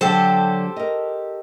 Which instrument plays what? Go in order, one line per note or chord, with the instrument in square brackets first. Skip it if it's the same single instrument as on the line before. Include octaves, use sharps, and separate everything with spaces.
[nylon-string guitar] D3 F#3 [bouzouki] G4 A4 C5
[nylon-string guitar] A#4 D#5